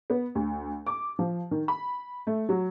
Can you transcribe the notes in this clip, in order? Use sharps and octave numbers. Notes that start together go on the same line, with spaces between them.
B3
D2
D6
F3
D#3
B5
A3
F#3